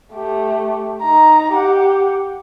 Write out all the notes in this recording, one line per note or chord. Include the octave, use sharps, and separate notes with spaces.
A3 G4
D#4 A#5
G4 F#5